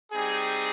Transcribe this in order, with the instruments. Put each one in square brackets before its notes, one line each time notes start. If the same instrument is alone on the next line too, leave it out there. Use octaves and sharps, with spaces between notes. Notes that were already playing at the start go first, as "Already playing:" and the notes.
[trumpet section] G3 C4 D#4 G#4